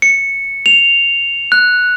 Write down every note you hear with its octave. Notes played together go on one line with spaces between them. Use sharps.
C#7
F7
F#6